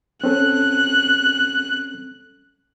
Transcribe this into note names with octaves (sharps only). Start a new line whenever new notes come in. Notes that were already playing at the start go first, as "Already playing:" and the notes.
C4 C#4 A4 F#6